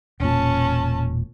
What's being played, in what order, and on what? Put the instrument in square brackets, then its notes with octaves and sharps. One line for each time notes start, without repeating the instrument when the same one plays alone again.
[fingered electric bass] E1 A#2 [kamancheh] C#4 A5